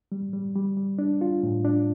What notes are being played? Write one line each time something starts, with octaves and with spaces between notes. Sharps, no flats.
G3
G3
G3
G3
D4
F4
A2
D4